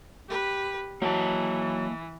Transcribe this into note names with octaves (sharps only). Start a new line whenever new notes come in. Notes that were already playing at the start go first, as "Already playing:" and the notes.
G4 B4
E3 F#3 A#3 D#5 A5